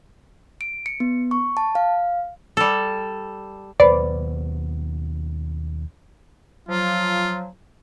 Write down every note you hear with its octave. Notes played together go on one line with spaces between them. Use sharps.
D7
C#7
B3
C#6
A5
F5
G3 A4
D#2 B2 F#3 B4 C5 D5 B5
F3 F#3 F4